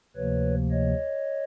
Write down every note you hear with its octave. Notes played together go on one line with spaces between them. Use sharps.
D2 C3 F3 A#3 B4 C#5
C#5 D#5